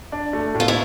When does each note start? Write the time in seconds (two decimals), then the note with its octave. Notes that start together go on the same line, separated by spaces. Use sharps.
0.12 D4
0.33 A3
0.55 A2
0.60 F4
0.68 E4